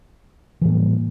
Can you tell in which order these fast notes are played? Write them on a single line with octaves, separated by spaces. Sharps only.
E3 A2 A#3 G3